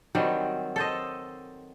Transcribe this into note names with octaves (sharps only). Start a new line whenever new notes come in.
D#3 F#3 G3 C4
A4 C5 D#5